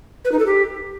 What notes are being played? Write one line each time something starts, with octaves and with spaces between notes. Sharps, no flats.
B4
D#4
A4
G4